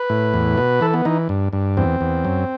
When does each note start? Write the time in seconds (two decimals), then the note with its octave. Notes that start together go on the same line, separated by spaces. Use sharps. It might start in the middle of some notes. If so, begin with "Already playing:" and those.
Already playing: B4
0.10 A2
0.34 E2
0.58 B2
0.81 E3 A4
0.94 B3
1.05 E3 D#4
1.29 G2
1.53 G2
1.77 E2 C4
2.01 E2
2.25 F#2